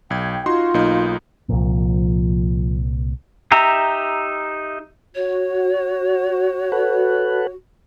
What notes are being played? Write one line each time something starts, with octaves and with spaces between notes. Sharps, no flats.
B1 G5 G#6
D#4 F4 F#4 C6
B1 A#3 D#4
C2 A#2 F3
D#4 G4 E5 A#5
F#4 C#5
A4 B4 F#5